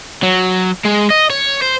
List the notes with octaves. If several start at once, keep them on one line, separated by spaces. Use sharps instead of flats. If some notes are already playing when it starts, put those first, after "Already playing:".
F#3
G#3
D#5
C#5
C5